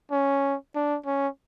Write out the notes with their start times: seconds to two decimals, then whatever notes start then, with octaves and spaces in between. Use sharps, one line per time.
0.11 C#4
0.75 D4
1.06 C#4